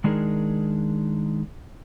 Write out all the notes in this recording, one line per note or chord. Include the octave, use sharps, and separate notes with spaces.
D#3 G#3 D4 D#4 G#4 A#4